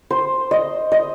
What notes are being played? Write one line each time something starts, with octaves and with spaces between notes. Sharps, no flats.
C5
D#5
D#5